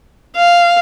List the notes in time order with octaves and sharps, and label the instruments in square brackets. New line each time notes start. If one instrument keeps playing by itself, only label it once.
[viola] F5